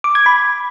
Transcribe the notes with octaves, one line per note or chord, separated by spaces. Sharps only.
D6
G#6
B5